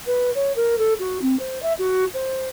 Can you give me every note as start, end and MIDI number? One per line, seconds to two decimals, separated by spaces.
0.06 0.30 71
0.34 0.52 73
0.55 0.77 70
0.78 0.93 69
0.99 1.18 66
1.21 1.37 60
1.39 1.61 72
1.62 1.72 76
1.78 2.04 66
2.14 2.48 72